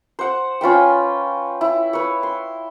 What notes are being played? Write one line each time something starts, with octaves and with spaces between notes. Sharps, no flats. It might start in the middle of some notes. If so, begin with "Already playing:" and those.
C5 F#5
C#4 F4 B4 G5
E4
B4 C#5
C6